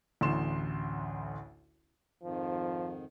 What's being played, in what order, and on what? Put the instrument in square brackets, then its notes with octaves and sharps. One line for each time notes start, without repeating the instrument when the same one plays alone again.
[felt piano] A1 D2 A2 C6 E7
[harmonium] F2 G#2 D#3 [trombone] F3